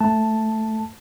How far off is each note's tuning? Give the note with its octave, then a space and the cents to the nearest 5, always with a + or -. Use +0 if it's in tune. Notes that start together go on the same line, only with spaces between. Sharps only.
A3 +0 A5 +0